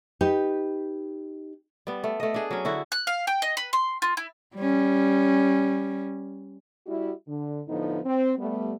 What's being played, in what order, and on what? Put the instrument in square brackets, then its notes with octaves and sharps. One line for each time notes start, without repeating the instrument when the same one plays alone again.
[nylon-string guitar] D#4 G4 B4
[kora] G3 B3
A3
A3 D#5
D4 G#4
F#3 C#4
D3 E4 F#4
[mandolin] F#6
F5
G5
D#5
B4
C6
F4
E4
[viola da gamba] G3 C#4
[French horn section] G3 E4 F#4
D3
A2 D3 F3 B3 D#4
C4
G3 A3 B3